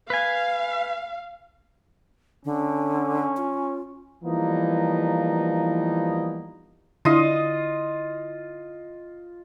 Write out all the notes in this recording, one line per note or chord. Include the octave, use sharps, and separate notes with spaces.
B4 F5 G#5
D3 C#4
F4
E3 F3 G3 A#3 B3 D#4
D3 E4 F4 D#5